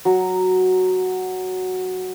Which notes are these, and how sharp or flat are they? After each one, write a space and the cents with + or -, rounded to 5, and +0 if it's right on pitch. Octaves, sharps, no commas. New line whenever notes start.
F#3 +0